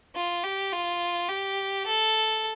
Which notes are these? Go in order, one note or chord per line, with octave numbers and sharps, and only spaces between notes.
F4
G4
F4
G4
A4